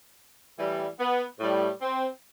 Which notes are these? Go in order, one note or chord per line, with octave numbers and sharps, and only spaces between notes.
A2 E3 G3
B3
A2 G3
C4